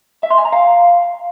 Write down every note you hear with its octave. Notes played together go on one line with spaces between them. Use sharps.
E5
C6
G#5
A#5
F5